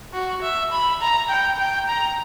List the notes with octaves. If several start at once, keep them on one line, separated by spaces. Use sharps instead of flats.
F#4
E5
B5
A#5
G5
G5
A#5